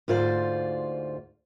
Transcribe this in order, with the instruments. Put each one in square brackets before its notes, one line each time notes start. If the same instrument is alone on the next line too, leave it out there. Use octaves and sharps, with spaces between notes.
[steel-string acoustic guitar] D2 G#2 F4 C5 D5